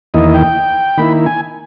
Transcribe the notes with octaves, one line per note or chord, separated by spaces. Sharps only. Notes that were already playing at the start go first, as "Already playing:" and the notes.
E2 D#3 A#3 E4 D#5
G5
D#3 A#3 E4 B5
G#5